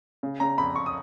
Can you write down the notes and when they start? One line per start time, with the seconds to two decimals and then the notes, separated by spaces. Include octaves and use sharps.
0.23 C#3
0.40 C#3 A#5
0.58 F2 B5
0.76 F2 C#6
0.86 D#6